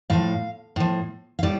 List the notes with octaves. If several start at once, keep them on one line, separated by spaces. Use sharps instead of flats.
A2 F3 F5
A2 F3
F5
A2 G3 D5